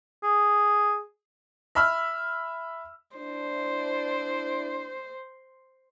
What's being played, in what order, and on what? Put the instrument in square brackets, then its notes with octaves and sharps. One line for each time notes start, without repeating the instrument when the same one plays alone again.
[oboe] G#4
[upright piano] E5 B5 E6 F6
[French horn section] D4 E4 [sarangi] C5